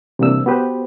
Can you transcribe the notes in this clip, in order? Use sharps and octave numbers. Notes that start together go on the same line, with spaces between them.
C3 E3 G3 A#3 D4 E6
B3 F#4 G4 B4 C5